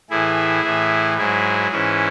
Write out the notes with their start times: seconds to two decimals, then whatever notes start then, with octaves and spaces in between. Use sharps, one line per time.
0.10 A2 E3 E4 G#4
0.64 A2 E3
1.18 G#2 F#3 E4 G#4
1.71 G#2 E3 C#4 E4